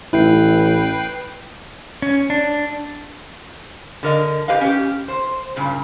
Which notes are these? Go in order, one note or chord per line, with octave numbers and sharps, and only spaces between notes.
A1 E4 B4 G5 C7
C#4
D4
D3 A#4 D#5
G4 B4 D#5 F5
C#4 G4
C5
G2 A#2 C#3